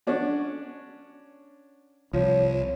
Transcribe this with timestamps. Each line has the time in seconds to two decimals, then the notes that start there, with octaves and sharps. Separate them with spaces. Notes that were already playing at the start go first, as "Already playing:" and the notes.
0.07 C#4 D4 F#4
2.13 C2 F3 C#5